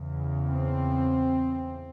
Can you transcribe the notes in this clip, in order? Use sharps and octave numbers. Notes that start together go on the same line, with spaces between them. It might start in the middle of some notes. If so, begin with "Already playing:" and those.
Already playing: E2 C#3
C4